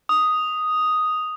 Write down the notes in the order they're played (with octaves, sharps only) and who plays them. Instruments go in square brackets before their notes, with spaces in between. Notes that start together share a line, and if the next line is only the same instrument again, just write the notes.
[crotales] D#6